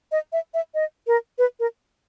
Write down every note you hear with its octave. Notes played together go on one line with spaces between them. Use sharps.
D#5
E5
E5
D#5
A#4
B4
A#4